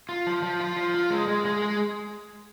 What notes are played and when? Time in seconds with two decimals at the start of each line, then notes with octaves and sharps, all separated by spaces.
0.09 F4
0.27 F3
0.43 F3
0.60 F4
0.77 F3
0.94 F4
1.10 G#3
1.28 G#3
1.45 G#3
1.62 G#4